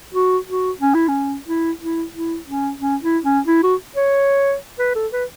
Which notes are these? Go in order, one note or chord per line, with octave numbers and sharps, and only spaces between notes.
F#4
F#4
C#4
E4
C#4
E4
E4
E4
C#4
C#4
E4
C#4
E4
F#4
C#5
B4
A4
B4